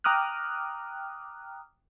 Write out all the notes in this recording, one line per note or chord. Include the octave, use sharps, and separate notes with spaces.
G5 A#5 D6 D#6 F6 F#6